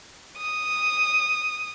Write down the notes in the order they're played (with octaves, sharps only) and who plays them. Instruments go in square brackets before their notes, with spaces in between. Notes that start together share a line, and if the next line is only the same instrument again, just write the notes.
[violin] D#6